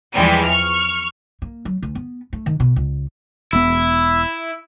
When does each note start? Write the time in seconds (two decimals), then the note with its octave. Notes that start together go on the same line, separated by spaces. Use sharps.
0.15 E2 E3 F3 G3 G#3
0.45 C#6 F6
1.42 A#3
1.65 F#3
1.82 D2
1.95 B3
2.33 A3
2.46 D#3
2.60 B2
2.76 C#2
3.53 E1 B3 E4 E6